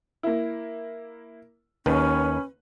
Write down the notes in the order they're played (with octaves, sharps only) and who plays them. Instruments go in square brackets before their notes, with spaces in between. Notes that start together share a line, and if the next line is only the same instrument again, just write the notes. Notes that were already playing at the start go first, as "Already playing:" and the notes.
[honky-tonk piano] A#3 E4
[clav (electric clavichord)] D#2 D#3 [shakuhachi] C#4 [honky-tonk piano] B4